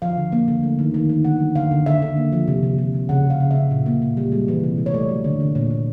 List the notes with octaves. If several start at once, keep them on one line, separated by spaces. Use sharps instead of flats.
F3 F5
D3
A#3
D3
A3
D#3
D#3
D#3
D3 F#5
F#3
D3 F5
D3
D3 E5
D3
A#3
F3
C3
C3
C3
C3
C#3 F#5
C#3
F5
C#3
C#3 E5
A#2
A#3
A#2
G3
G#3
E3
C3
G#3
C#5
A3 D5
F#3
D3
D3
A#2 C#5
A#2